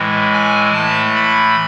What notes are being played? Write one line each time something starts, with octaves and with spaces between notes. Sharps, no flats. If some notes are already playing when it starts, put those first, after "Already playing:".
Already playing: A2 E3 G#3
G#5
A2 E3 A3 A5
B5